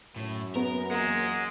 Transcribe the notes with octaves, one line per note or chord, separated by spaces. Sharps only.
F#2 A2
B3 A#4
G#3 A#3 F#5 A#5